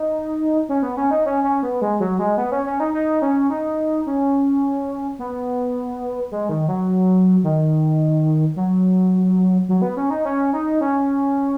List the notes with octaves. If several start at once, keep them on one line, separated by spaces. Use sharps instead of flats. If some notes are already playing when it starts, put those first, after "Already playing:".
Already playing: D#4
C#4
B3
C#4
D#4
C#4
C#4
B3
G#3
F#3
G#3
B3
C#4
C#4
D#4
D#4
C#4
D#4
C#4
B3
G#3
D#3
F#3
D#3
F#3
F#3
B3
C#4
D#4
C#4
D#4
C#4